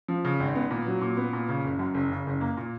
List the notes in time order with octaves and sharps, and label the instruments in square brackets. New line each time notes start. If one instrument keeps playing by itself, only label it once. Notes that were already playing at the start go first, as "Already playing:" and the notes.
[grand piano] F3
C#3
G#1
B3
A#2
F#3
A#2
B3
A#2
C#3
F#1
F#2
F#1
C#3
F#1
A#3
A#2